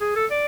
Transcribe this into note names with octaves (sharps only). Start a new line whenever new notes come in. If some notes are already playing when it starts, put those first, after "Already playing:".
G#4
A4
D5